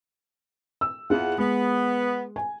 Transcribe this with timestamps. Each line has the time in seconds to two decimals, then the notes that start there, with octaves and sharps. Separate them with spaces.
0.81 E6
1.10 E2 F4 G#4 F#5
1.38 G#3 B3
2.36 G#5